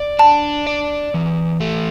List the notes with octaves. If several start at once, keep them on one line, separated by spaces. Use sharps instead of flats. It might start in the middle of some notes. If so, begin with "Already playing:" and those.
Already playing: D5
D4 A5
D5
E3
A3